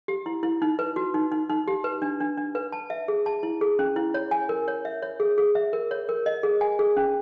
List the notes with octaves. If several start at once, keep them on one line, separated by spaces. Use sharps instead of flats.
G4
E4
E4
D#4
B4
F#4
D#4
D#4
D#4
G4
B4
D4
D4
D4
B4
A5
E5
G#4
A5
E4
G#4
C#4
E4
C#5
G#5
A#4
C#5
E5
C#5
G#4
G#4
E5
A#4
C#5
A#4
D#5
G#4
G#5
G#4
C#4